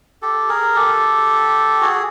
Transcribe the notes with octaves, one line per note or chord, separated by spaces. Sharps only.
G4 A4
G#4 A#4
G4 A4
F#4 G#4